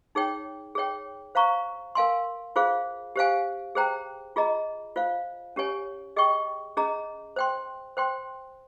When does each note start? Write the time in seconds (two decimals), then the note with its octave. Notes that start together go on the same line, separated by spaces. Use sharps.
0.15 D#4 G#4 C#5 G5
0.75 G#4 C#5 G5
1.35 C5 F5 A#5 C#6
1.95 A#4 F5 G#5 C6
2.56 F4 G#4 C5 F5
3.16 G4 C5 F5 G#5
3.75 G#4 C5 G5 A#5
4.36 F4 G#4 D#5 A#5
4.96 F4 C5 F5
5.56 C#4 G4 C#5 G#5
6.16 G#4 D#5 G5 C#6
6.77 C#4 G#4 D#5 A#5
7.36 C5 G5 C6
7.97 C5 G5 C6